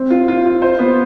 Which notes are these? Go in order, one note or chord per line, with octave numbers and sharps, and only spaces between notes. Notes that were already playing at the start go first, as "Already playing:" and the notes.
Already playing: C4
F4
F4
F4
C5
B3